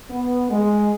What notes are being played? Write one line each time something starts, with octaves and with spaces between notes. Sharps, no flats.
B3
G#3